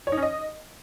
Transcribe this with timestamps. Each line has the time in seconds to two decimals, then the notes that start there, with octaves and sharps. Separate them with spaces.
0.07 C#5
0.12 D#4
0.17 C#4
0.23 D#5